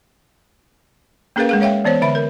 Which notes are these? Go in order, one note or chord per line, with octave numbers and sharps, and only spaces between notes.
A#3 C#4 G#4 A#4 B4 F5
G#3 G#4 F5
C#5 E5 F5 G5
E3 B3 C5 C#5
D3 E5 B5
A#4